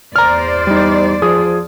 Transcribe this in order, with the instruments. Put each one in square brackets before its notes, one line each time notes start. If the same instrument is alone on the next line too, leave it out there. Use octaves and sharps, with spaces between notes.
[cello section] E2 C5 D5 [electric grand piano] A#5 F6
[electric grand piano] G3 D#4
F3 G#4 D#6